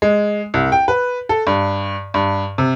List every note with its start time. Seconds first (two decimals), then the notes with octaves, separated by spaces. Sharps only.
0.02 G#3
0.54 C2
0.72 G5
0.88 B4
1.29 A4
1.47 G2
2.14 G2
2.58 C3